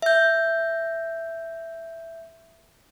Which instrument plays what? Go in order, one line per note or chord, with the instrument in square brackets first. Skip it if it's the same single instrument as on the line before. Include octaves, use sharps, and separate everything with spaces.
[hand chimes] E5 G6